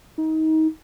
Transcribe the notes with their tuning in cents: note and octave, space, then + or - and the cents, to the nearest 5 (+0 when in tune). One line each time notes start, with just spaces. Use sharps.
D#4 +25